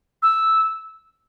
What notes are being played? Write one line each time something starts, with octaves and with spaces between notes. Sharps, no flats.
E6